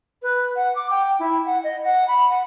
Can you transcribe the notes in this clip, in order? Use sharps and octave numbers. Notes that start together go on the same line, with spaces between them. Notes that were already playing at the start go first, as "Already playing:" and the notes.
B4
F#5
D6
G5
E4
F#5
D#5
F#5
B5
F#5